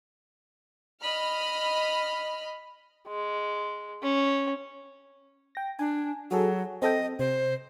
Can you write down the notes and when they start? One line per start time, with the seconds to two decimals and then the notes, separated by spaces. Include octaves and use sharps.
1.01 D#5 B5 F6
3.08 G#3
4.03 C#4
5.55 G5 A#6
5.79 D4 G#5
6.31 F#3 F#4 G#4 A4
6.82 C4 A4 D#5 G5
7.19 C3 C5